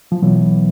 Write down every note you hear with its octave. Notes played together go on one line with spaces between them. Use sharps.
F3
B2 E3 F#3